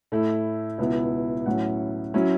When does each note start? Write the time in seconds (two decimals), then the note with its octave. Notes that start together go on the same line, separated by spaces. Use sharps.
0.12 A2 A3 E4
0.78 C#2 B2 B3 E4
1.46 A1 A2 F#3 C#4 E4 F#5
2.14 F#3 C#4 E4